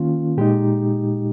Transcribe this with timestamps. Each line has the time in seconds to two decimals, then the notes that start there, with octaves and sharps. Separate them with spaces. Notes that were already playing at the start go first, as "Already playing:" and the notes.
Already playing: D#3 A#3 C#4 F4
0.37 A#2 G#3 D#4 G4